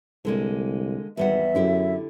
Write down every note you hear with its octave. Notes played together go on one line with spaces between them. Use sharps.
C2 D3 G#3 A#3
G#1 E2 G3 E5 F#5
F#2 D3 E4 G4